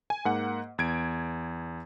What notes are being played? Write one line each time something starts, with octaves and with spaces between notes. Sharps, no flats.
G#5
G#2 A#3 F#5
E2 G#6 D7